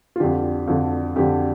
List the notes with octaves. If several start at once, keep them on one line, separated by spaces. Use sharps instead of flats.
F4
F2 D3 G4
F2 D3
F2 D3 G4